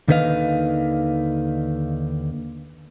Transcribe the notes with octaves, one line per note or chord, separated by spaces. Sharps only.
D#2 D3 D#3 B4 D#5 F5